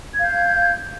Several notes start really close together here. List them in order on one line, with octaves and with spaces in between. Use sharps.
G#6 F5 G6